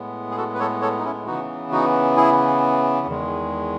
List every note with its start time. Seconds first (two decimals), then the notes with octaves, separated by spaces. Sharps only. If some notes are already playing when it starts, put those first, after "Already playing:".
Already playing: A2 G#3 B3
0.31 G#4
0.37 F#4 A4
0.55 B4
0.59 A4 C#5
0.82 A4 C#5
0.99 D#4
1.05 C#4 E4
1.27 C#3 E3 B3 D#4 F#4
1.72 D#4 F#4
2.17 E4 G#4
3.06 E2 D#3 G#3